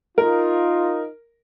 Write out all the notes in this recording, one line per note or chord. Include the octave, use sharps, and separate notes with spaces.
D#4 F4 A#4